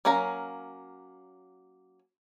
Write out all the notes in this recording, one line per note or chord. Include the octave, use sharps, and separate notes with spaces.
F#3 A#3 C#4 F5 A#5